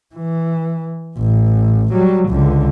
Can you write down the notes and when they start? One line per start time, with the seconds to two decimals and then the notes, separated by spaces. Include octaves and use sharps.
0.15 E3
1.18 A1
1.93 F#3 G3
2.29 C#2 D3